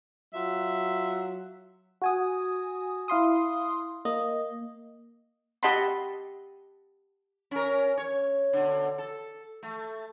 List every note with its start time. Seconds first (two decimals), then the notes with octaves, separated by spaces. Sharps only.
0.33 F#3 F4 E5
2.02 F#4 G#5 D#6
3.08 E4 F5 C6 D#6
4.05 A#3 D#5
5.63 G4 D#5 F#5 A5 B5 C6
7.51 C#4 A#4
7.97 C#5
8.53 B2 D3
8.98 A4
9.63 A3